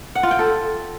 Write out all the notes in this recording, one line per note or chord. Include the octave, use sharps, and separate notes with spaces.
F#5
F4
G5
A4